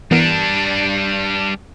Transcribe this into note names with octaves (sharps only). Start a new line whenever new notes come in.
E3 G3 B3 D4 A#4